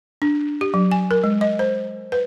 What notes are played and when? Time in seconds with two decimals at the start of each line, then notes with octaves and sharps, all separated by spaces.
0.22 D4
0.61 G4
0.74 F#3
0.91 G#5
1.11 A#4
1.24 G#3
1.41 D#5
1.59 C5
2.12 B4